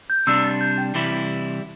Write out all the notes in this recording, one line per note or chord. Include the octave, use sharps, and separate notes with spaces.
G6
C3 G3 D4 E6
A6
G6
G5
C3 E3 G3 E4